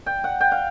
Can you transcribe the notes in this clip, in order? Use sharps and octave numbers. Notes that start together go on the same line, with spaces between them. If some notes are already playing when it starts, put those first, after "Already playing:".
G5
F#5
G5
F5